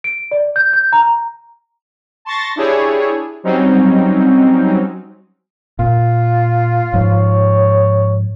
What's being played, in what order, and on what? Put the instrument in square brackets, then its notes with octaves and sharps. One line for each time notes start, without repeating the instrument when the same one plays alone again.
[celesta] D7
D5
G6
G6
A#5
[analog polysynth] A5 C6 C#6 A6 A#6
D4 E4 G4 G#4 C#5
F#3 G3 C4 C#4 D#4
[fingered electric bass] A#2 [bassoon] F4
[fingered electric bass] G#2 F3 [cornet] C#5